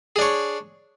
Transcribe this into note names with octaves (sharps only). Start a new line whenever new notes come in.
D4 G#4 C#5